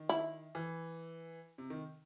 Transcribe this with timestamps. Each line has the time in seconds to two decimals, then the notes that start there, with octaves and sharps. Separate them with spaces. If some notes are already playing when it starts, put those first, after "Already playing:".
Already playing: D#3
0.09 E4
0.55 E3
1.58 C3
1.70 D#3